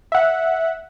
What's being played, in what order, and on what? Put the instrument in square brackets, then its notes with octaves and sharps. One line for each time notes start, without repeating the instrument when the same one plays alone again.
[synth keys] E5 F#5